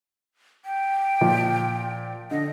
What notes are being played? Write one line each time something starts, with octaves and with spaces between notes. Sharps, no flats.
G5
A#2 F3
D3 D#5